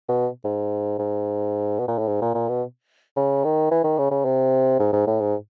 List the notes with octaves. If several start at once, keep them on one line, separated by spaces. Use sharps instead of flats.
B2
G#2
G#2
B2
A#2
A2
G#2
A#2
A#2
B2
C#3
D#3
E3
D#3
C#3
C#3
C3
G#2
G#2
A2
G#2